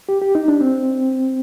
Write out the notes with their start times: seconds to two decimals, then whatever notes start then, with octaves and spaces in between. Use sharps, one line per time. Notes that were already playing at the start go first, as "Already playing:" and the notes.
0.09 G4
0.22 G4
0.35 D#4
0.48 D4
0.61 C4